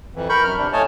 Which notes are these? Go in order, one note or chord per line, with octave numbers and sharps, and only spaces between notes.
F2 E3
A#4 B5 C#6 G6
F#2 F6
C3 D4
A2 A3 C#5 D#5 G#5 A5